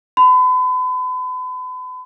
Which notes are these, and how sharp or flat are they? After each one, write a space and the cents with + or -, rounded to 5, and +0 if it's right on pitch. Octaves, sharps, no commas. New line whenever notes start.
B5 +40